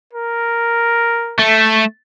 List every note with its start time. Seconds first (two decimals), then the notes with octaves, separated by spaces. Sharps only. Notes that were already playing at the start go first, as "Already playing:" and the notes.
0.13 A#4
1.39 A3